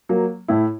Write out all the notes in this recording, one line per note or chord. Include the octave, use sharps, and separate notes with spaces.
F#3 A#3
A2 E4